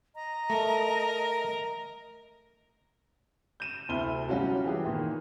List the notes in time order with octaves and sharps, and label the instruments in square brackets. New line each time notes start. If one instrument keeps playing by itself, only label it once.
[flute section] D#5 A#5
[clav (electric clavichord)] A3 [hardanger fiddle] A#4
[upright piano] G6 D#7 E7
D2 C3 A3 E4 F6 G7
F#3 G3 C#4 F4 F#4
E3 G4 G#4
A#2 D#3